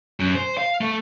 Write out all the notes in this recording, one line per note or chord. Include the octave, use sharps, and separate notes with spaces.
F#2
C5
F5
A3